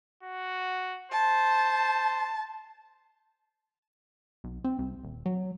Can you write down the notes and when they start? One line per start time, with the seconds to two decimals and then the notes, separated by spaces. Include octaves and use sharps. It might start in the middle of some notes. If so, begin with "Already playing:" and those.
0.23 F#4
1.12 C5 A5
4.44 B1
4.64 C4
4.79 C2
5.04 D#1
5.26 F#3